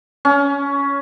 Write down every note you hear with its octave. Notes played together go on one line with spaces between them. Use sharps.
C#4